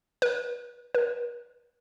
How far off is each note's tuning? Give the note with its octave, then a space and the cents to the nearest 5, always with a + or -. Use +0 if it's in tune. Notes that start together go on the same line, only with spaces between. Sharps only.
B4 -30
B4 -45